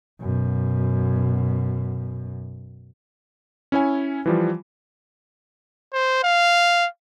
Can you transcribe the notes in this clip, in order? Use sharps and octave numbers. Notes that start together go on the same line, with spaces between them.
F#2 B2
C#4 E4 C#5 G#5
E3 F3 G3
C5
F5